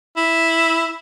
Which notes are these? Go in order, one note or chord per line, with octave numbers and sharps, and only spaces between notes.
E4